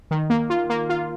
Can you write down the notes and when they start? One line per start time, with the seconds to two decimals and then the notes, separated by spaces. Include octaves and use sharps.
0.11 D#3
0.30 A#3
0.50 F4
0.70 A#3
0.90 F4